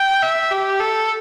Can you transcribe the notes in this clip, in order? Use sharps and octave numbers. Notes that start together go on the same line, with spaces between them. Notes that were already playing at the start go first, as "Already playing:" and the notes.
Already playing: G5
E5
G4
A4